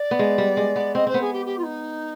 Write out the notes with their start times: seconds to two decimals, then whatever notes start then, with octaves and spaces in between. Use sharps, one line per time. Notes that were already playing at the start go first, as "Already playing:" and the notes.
Already playing: D5
0.11 B3
0.19 G#3
0.38 G3
0.57 G#3
0.76 B3
0.95 C4 D#5
1.07 C4 C5
1.14 B3
1.21 G#4
1.33 G4
1.46 G4
1.58 F4
1.63 D#4